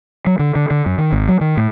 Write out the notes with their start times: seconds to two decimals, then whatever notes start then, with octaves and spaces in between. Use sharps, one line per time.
0.27 F#3
0.39 D3
0.55 D3
0.71 D3
0.86 F#2
0.98 D#3
1.12 G#1
1.28 F#3
1.41 D#3
1.57 A2